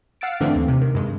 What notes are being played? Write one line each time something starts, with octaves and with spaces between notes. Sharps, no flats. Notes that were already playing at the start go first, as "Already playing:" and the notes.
F5 F#5 E6 A6 D7
G#2 D3 E3 A3 C4 D4
D#2
C3
D#3
G2 G#3